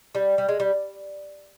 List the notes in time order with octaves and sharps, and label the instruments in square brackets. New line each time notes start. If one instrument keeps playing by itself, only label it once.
[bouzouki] G3
G3
G#3
G3